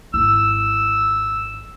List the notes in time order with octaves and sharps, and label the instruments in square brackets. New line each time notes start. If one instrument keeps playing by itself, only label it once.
[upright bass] G#1 E4 [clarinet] E6